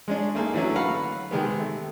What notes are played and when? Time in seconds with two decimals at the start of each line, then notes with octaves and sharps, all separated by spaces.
0.08 G#3 C#4 D4
0.35 A3 A#3 D#4 G#4
0.53 D3 E3 F#3 A3 C#4
0.76 B4 F5 F#5 A#5 B5 C#6
1.31 C3 D#3 G#3 B3
1.60 A3